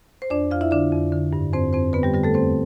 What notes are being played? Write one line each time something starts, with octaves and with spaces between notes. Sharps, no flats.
C5
F2 D4 D5
F2 F4 F5
E4 E5
D3 D4 D5
F2
D3
G2
F2 C4 C5
F2 C4 C5
D3 B3 B4
G3 G4
D3 G3 G4
A3 A4
E2 C4 C5